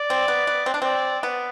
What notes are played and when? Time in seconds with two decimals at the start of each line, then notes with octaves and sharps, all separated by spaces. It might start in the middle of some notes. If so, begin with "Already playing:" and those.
Already playing: D5
0.10 C4
0.28 B3
0.47 B3
0.66 C4
0.74 D4
0.82 C4 D5
1.23 B3